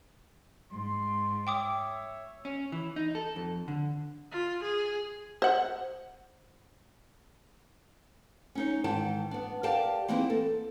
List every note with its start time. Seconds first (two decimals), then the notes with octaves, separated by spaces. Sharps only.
0.71 G#2 C6
1.47 C#5 E5 G5 D6 D#6
2.45 C#4
2.72 E3
2.96 D#4
3.15 A4
3.36 F2
3.68 D3
4.31 F4
4.63 G#4
5.42 C5 F#5
8.55 C#4 D#4 C#5
8.84 G#2 D#3 E3 G5 A5
9.31 B3 D4
9.63 G4 A#4 D5 F5 G5 A5
10.08 E3 A#3 C4 D#4 E4 G#4
10.30 A4